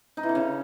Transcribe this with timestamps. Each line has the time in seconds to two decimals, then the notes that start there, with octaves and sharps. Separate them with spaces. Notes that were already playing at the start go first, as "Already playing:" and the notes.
0.17 D#4
0.23 E3
0.29 D3
0.35 C#3